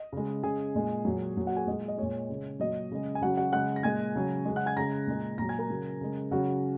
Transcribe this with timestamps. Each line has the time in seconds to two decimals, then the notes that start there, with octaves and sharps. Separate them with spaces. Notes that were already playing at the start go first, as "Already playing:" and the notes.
Already playing: D#5
0.13 C#3 G#3
0.43 C#3 G#3 G#4 G#5
0.75 A#2 G#3
1.05 A#2 F#3
1.37 A#2 F#3
1.47 F#4 F#5
1.56 G#4 G#5
1.67 A#2 G#3 D#5
1.88 D#5
1.98 A#2 G#3 C#5
2.30 C#3 G#3
2.60 A#2 F#3 D#5
2.92 C#3 G#3
3.15 G#5
3.22 C#3 F#3 F#4 F#5
3.37 F#4 F#5
3.53 C#3 G#3 F#5 F#6
3.76 A#6
3.83 A#2 G#3 G#5 G#6
4.15 C#3 F#3
4.45 G#3
4.51 C#3
4.56 F#5 F#6
4.66 G#5 G#6
4.76 C#3 G#3 A#5 A#6
5.07 A#2 G#3
5.38 A#2 F#3 A#5 A#6
5.49 G#5 G#6
5.59 A#4 A#5
5.70 C#3 F#3
6.01 C#3 G#3
6.31 C#3 F#3 F#4 F#5